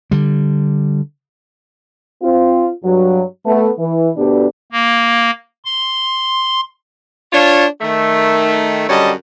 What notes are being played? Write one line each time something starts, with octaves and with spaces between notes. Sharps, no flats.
D3 G3
C4 F4
G2 F#3
A3 B3
E3
D2 B2 B3 D4 G4
A#3
C6
D4 F4 C#5
D#3 A3
F#2 D3 G3 C#5 D#5 A5